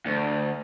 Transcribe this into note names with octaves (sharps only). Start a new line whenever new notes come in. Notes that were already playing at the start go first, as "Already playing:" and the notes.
D2